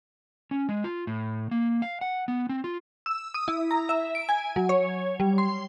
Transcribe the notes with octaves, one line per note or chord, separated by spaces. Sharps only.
C#4
G#3
F4
A2
A#3
F5
F#5
B3
C4
F4
E6
D#6
E4
A#5
E5
D7
G#5
F#3
C#5
G3
C6